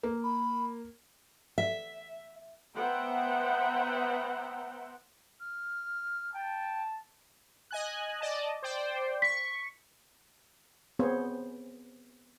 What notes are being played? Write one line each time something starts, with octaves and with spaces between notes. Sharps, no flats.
A#3
B5
E5
B3 C5 E5 F#5 G5 A#5
F6
G5 A5
D#5 G#5 F#6
D5 D#5 A5
C5 D5 G5
C#6 B6
B3 C4 G#4 C5 C#5